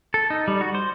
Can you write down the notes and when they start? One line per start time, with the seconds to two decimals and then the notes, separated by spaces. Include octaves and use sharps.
0.14 A4
0.30 D#4
0.48 G3
0.61 F#4
0.75 C5